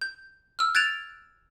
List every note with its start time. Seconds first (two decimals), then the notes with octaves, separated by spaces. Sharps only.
0.01 G6
0.59 E6 F6
0.75 F#6 G#6 A6 D7 E7 F7